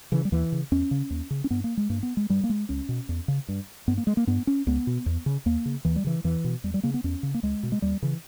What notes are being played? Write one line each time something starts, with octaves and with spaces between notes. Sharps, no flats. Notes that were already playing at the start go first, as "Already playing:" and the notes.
C#3 E3
G3
D#2 E3
C#3
E2 C#4
C#3
D#2
C#3
C#4
G2 B3
A#3
G#3
G2 A#3
B3
G#3
G2 G3
A#3
G#3
C#2 C#4
B2
E2
C#3
G2
G2 B3
A#3
G#3
A#3
G2 B3
C#4
C#2 B3
B2
E2
C#3
D#2 A#3
C#3
D#2 E3
G3
C#3 E3
E2 E3
B2
E2 G3
G3
C#3 A#3
B3
E2 C#4
C#3
A#3
C#2 G#3
B2
G#3
D#2 G3
C#3 E3